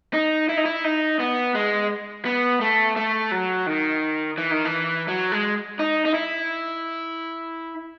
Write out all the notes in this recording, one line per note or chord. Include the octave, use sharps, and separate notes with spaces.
D#4
E4
D#4
E4
D#4
B3
G#3
B3
A3
A3
F#3
D#3
E3
D#3
E3
F#3
G#3
D#4
D#4
E4